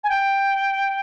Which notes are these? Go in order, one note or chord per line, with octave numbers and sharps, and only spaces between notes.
G#5
G5